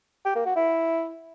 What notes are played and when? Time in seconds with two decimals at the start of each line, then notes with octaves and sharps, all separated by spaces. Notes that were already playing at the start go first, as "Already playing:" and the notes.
0.25 G4
0.35 A#3
0.45 F#4
0.56 E4